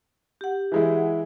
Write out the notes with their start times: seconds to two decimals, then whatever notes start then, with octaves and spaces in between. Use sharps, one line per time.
0.41 G4 F#5
0.72 E3 G#3 E4